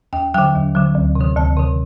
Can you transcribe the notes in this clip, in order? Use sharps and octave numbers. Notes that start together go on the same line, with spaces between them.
D#2 G5
D3 F#3 G5
D#2
D3 F#3
D2
C3
D#3
D2 A5
C3 D#3